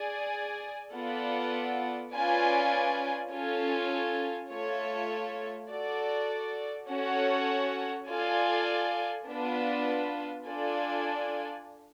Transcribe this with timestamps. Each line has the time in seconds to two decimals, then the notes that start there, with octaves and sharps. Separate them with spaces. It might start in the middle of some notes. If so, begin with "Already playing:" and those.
Already playing: G#4 D5 G#5
0.95 B3 F4 A4 D5 F#5
2.13 C#4 F4 B4 D5 G#5
3.32 C#4 F4 A4 C#5 G#5
4.51 A3 F4 A4 C#5
5.70 F#4 A4 D5
6.90 C#4 F#4 A4 C#5 F#5
8.09 F4 A4 D5 G#5
9.27 B3 D4 F4 B4
10.47 D4 F4 A4 D5 G#5